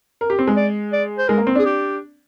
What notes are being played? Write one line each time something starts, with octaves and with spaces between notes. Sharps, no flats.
A#4
G4
C4
G#3
D5
D5
C5
G#3 A#4
A#3
C4
D4 G#4
G4